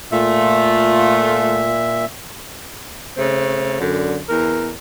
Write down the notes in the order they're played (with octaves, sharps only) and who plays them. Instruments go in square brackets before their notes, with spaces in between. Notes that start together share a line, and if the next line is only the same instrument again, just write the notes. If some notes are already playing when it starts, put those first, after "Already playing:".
[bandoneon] A#2 E5 [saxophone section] A3 F4
[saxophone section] C#3 A3 C4
F#2 D3
E2 A#4